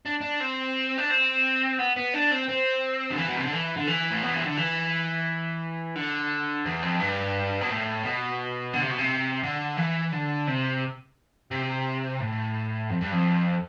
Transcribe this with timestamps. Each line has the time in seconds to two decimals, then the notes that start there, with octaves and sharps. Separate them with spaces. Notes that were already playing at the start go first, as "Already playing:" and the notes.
0.05 D4
0.21 D4
0.40 C4
0.98 D4
1.10 C4
1.79 B3
1.96 B3
2.14 D4
2.31 C4
2.48 C4
3.11 D3
3.18 E3
3.28 B2
3.37 C3
3.44 D3
3.52 E3
3.77 D3
3.87 E3
4.11 A2
4.22 B2
4.34 C3
4.45 D3
4.57 E3
5.96 D3
6.65 E2
6.82 F2
7.00 G2
7.61 B2
7.69 A2
8.04 B2
8.73 D3
8.82 C3
8.91 B2
8.99 C3
9.43 D3
9.77 E3
10.12 D3
10.47 C3
11.51 C3
12.20 A2
12.90 F2
13.01 G2
13.12 F2